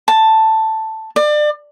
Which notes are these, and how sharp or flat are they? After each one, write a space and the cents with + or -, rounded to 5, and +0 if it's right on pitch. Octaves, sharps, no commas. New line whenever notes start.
A5 +5
D5 +30